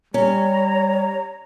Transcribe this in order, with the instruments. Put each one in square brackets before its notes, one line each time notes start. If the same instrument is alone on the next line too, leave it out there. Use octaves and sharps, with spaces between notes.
[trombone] G3 [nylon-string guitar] C#4 [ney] C#5 [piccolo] A#5